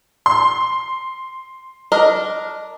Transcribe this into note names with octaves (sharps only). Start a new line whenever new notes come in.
C6
D4 A#4 D#5